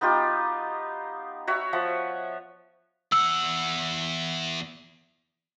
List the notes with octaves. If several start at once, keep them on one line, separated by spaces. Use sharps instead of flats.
B3 D#4 F4 G4
F#4 C#5 E5
F3 E5 F#5
E2 F#5 E6